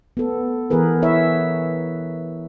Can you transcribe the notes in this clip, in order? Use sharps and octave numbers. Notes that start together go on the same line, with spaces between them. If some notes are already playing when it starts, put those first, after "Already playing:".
B3 A4
E3 B3 G#4 A#4 B4
E4 B4 C#5 E5